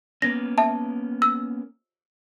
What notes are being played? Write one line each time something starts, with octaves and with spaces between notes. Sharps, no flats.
A#3 B3 C#4 A#6
E5 A5
E6